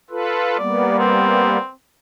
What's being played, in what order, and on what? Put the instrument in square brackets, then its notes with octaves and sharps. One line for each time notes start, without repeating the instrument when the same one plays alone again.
[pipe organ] F4 A4 B4
[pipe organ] G3 A#3 B3 [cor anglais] D5
[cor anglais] C4